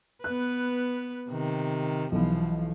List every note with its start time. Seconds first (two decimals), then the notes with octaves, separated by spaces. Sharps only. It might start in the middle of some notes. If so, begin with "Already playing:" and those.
0.24 B3 B4 F#6
1.29 C3 D#3
2.12 B1 B2 E3 F3